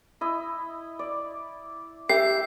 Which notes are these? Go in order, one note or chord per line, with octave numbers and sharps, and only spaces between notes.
E4 D#5
D5
G4 E5 C7